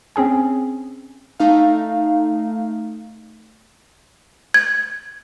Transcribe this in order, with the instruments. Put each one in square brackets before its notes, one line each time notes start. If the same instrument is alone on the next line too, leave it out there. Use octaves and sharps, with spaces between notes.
[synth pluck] C4 C#4 G#4 G#5
[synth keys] A3 D#4 F5
[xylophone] G#6